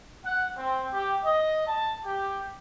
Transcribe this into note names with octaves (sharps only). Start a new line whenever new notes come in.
F#5
C4
G4
D#5
A5
G4